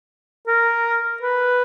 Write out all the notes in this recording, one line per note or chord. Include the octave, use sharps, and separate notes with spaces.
A#4
B4